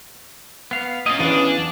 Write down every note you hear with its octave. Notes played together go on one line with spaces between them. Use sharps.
B3 F5
A#3 C#4 F4 D#5
E2 E3 D4 F5